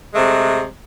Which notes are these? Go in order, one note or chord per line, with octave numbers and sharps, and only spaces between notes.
C3 G#3 A3